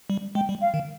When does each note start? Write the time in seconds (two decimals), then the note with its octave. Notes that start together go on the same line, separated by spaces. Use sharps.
0.10 G3
0.35 G#3 G5
0.49 G3
0.61 F5
0.74 D#3